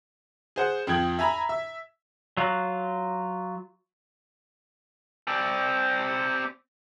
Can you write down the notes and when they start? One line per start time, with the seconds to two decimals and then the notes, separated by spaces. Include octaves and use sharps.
0.56 G#4 C5 F#5
0.87 F2 F3 G5 G#6 F#7
1.19 E5 G#5 A#5 B5
1.49 E5
2.37 F#3 F4
5.28 C4 D5